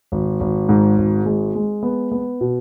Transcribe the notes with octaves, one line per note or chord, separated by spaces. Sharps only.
G#1
G#1
G#2
G#1
G#3
G#3
B3
B3
B2